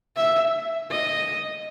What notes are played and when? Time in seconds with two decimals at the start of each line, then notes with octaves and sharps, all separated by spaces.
0.16 E5
0.91 D#5